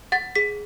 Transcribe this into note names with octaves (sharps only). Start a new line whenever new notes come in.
F#5 A6
G#4 B6